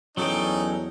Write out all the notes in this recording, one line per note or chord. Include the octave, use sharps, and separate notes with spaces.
E2 F#3 C#4 D#4 A4 G5